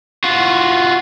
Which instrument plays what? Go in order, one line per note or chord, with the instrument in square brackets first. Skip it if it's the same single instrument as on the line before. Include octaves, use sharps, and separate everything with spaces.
[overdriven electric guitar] F4 F#4